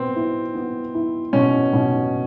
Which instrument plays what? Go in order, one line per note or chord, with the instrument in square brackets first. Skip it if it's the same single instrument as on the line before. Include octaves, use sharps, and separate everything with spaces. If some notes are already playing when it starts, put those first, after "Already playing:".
Already playing: [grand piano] B2 B3 [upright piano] C4
[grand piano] E4
B3
E4
[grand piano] B2 [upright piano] C#4
[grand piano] B2